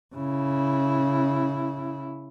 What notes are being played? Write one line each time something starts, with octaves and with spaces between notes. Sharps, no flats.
C#3 E4